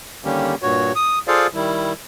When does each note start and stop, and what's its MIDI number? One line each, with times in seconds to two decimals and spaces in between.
0.25 0.55 50
0.25 0.55 51
0.25 0.55 55
0.25 0.55 58
0.25 0.55 61
0.25 0.55 67
0.62 0.92 43
0.62 0.92 46
0.62 0.92 66
0.62 0.92 73
0.96 1.19 87
1.28 1.47 65
1.28 1.47 68
1.28 1.47 69
1.28 1.47 72
1.28 1.47 74
1.28 1.47 77
1.54 1.93 51
1.54 1.93 55
1.54 1.93 64